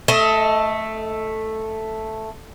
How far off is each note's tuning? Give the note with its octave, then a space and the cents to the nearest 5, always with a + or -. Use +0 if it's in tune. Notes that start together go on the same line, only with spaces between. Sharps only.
A3 +0 A4 +0 D#5 +30